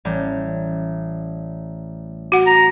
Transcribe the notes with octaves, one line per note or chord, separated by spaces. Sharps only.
A1 G3
F#4 F#5
A#5